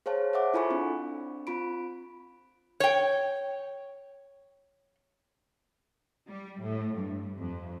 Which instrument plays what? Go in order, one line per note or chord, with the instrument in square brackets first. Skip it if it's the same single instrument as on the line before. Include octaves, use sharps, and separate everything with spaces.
[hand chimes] G#4 C5 C#5 F5 A5
C5 E5 F#5 D6
E4 F4 A4 G#5 B5 C#6
C4 D4
C4 F4 B5 D7
[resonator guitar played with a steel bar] C#5 G5
[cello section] G3
A2
G2
F2